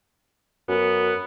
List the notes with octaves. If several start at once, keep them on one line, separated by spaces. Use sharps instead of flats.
F#2 B3